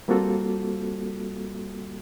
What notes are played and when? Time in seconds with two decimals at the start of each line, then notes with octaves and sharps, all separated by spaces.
0.08 G3 A#3 C4 F4 F#4 A4